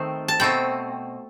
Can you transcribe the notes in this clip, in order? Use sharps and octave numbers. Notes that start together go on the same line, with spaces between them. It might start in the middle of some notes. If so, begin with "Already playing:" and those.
Already playing: D#3 A3 C4
A5
B2 A3 C4 G5